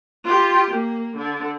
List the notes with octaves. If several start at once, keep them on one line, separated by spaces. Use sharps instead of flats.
F4 G4
A#3
D3